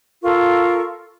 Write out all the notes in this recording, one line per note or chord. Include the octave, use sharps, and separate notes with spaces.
F4 A4 A#4 C#6